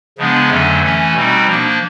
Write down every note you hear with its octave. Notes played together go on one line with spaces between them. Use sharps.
C#3 F3 G#3 B3 D4
F2 D3 F#3 A3 C#4
E3 A3 C#4
B2 G3 C4 D#4
F3 A#3 D4